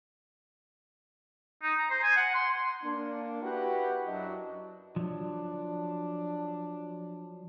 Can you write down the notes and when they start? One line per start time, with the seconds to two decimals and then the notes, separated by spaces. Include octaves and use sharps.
1.63 D#4
1.79 A#5
1.90 C5
2.03 G#5
2.16 F#5
2.35 C6
2.84 A#3 D4
3.41 E4 F#4 G4 B4 F#5
4.06 F#2 F#3 D4 E4 D#5
4.96 F3 F#3 D4